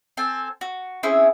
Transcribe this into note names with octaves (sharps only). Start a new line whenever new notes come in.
C4 A4 G#5
F#4
C4 C#4 E4 G#4